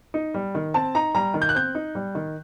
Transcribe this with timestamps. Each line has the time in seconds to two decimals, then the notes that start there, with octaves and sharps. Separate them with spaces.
0.14 D#4
0.34 G3
0.55 D#3
0.74 C4 A5
0.95 D#4 A#5
1.15 G3 A#5
1.34 D#3
1.42 G6
1.49 F#6
1.55 C4 G6
1.75 D#4
1.95 G3
2.15 D#3